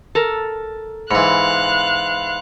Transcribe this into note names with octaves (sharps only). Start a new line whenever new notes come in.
A4 A#4
G#2 E3 F5 B5 C6 F#6 C#7